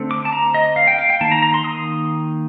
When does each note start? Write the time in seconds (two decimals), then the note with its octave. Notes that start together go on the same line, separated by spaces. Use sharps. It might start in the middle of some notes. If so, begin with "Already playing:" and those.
Already playing: D3 A3 C4
0.11 D6
0.25 A5
0.33 A#5
0.54 D#5
0.76 F5
0.87 G5
0.98 F5
1.10 G5
1.21 D#3 A#3 A5
1.32 A#5
1.42 A#5
1.54 C6
1.64 D#6